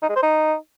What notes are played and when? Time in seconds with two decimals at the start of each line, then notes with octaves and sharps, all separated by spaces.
0.02 D#4
0.09 G#3
0.16 C5
0.22 D#4